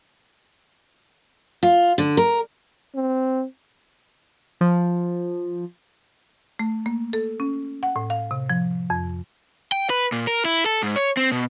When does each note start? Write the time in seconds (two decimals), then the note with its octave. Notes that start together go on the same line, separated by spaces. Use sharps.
1.63 F4
1.98 D3
2.17 A#4
2.95 C4
4.61 F3
6.59 A3
6.86 A#3
7.13 A4
7.40 C#4
7.83 F#5
7.96 A2
8.10 F5
8.31 C3
8.50 F3
8.90 F2
9.72 G5
9.90 B4
10.12 A#2
10.27 A#4
10.45 E4
10.66 A4
10.83 G#2
10.96 C#5
11.17 C4
11.32 B2